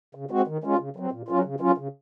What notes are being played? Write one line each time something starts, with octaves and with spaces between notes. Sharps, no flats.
C#3
G#3 C4 F#4
D#3
G#3 C#4 F4
C#3
F#3 C4
A#2
F#3 C#4 F4
C#3
F#3 C#4 F4
C#3